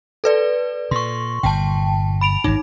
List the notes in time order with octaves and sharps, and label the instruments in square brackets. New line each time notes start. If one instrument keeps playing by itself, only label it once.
[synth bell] A4 B4 D5
[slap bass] A#2 [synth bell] C6 C#6
[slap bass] G1 A#2 [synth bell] G5 A5
[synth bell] B5 D7 F7
[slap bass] G#1 G2 [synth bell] D#4